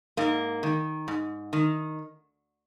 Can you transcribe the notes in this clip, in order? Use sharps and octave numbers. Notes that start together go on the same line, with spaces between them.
G#2 A#3
D#3
G#2
D#3